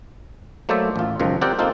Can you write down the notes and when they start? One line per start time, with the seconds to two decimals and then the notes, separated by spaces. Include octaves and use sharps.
0.69 F#3 A3 A#3 C5 D5 E5
0.96 A1 F4
1.20 C#2 F#2 D#3 F3
1.41 C4 G4 A#4 D5 F#5 G5
1.58 A#3 C4 D#4 F4 A4